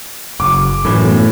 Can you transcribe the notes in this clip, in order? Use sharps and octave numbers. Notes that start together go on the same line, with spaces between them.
F#1 D6
F#2 A2 E3
A3 B3